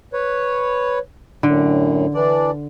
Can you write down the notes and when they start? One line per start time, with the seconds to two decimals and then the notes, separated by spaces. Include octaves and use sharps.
0.13 B4 C#5
1.43 F#2 A2 D3
2.14 E3 D4 D5